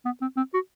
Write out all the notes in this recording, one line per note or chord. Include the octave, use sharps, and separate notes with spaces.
B3
C4
C4
F#4